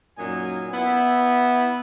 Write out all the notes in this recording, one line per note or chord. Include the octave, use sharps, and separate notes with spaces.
F#2 A#2 D#4 G#5
B3 E4